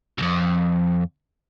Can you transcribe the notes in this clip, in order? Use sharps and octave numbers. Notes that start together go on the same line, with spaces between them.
C2 F2